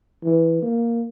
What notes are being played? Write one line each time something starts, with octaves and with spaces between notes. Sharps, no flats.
E3
A#3